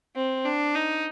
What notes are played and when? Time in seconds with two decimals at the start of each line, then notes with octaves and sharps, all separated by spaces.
0.16 C4
0.45 D4
0.75 D#4